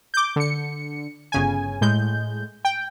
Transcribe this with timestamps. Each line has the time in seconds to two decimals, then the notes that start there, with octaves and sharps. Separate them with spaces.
0.14 D6 G6
0.36 D3 C#7
1.32 G1 C#3 G#5
1.81 A2 G#3 G6
2.65 G5